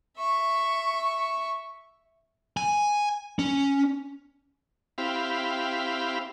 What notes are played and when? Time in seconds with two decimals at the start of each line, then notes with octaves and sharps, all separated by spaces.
0.17 E5 C#6
2.57 G#5
3.39 C#4
4.98 C4 E4 G4 F5 B5